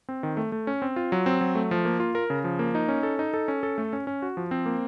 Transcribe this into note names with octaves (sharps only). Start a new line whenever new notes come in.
C4
D#3
A3
A3
C#4
C4
F4
F#3
C4
F#3
A3
F3
A#3
F4
A#4
C#3
F3
A#3
D#4
C#4
A4
D#4
A4
C#4
A4
A3
C#4
C#4
F#4
F3
C4
A#3